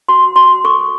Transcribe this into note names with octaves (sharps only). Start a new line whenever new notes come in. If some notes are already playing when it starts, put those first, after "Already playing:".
F#4 C6
F#4 C6
A4 C#6